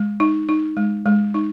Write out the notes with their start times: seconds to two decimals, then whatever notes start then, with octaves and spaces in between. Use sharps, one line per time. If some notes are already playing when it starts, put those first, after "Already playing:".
Already playing: G#3
0.20 D#4
0.49 D#4
0.77 G#3
1.06 G#3
1.34 D#4